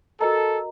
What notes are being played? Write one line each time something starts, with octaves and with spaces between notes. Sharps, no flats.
F#4 A4 A#4 D#5 A#5